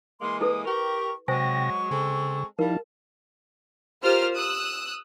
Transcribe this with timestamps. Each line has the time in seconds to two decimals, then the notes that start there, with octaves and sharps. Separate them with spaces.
0.21 E3 G#3 A#3 C6
0.41 E4 A4 B4 D#6
0.65 G4 A#4 C#6
1.28 C3 F#3 G#3 C5 G5 G#5 C#6 A#6
1.91 C#3 G#3 C4 A4
2.59 F3 G3 D#4 E4 A#4 F5 A5
4.02 F4 G4 A#4 C5 F6
4.35 D#6 E6 F#6